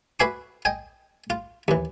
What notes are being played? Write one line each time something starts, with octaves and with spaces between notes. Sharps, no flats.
F#4 B4 E5 G#5 C6 D6
D#5 G5 G#5
F4
D#2 E3